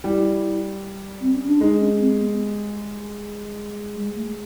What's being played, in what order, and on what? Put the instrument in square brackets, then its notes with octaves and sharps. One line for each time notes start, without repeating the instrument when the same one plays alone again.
[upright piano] G3 [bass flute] E4
[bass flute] C4
C#4
D4
[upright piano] G#3 [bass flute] D#4
[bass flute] C#4
C4
B3
G#3
A3